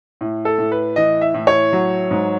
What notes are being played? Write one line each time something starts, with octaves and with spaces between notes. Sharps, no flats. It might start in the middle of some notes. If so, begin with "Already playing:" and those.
A2
A4
A2
B4
E3 D#5
E5
A2
C#5
F#3
G#2